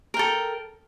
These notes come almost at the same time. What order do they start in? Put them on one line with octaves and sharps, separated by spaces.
A#4 G5 A4